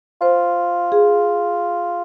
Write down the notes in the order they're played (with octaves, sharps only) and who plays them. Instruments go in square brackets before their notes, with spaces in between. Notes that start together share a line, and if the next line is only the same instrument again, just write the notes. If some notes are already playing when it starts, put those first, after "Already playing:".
[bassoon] F4 [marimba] C5
[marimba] G#4